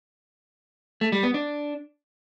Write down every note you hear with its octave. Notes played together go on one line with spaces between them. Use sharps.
A3
G3
B3
D4